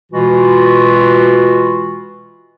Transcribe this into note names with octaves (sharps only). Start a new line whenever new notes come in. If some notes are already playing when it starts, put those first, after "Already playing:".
B2 E3 G#3 F4 F#4